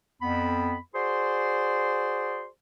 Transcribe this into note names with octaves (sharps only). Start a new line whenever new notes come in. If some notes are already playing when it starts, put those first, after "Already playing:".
F2 B3 B5
F#4 G#4 C5 D5 C6